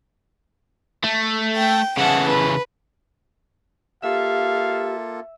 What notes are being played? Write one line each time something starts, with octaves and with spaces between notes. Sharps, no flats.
A3
G5
C#3 E3 F#5 A5
B4
A#3 F4 G4 A4 E5 F5